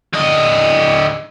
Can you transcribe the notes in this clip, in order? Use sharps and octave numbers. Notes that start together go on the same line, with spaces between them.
D3 D#5